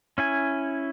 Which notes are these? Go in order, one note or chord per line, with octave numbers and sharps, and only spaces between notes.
C#4 E4 G#5